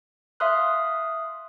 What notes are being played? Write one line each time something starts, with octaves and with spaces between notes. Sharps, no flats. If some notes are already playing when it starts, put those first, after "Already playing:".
E5 F5 C6 D#6 F6 F#6